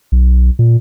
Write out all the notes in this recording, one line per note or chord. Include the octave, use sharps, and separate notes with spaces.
B1
A#2